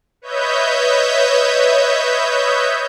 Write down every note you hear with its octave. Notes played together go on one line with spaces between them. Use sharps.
B4 C#5 D#5 E5 G6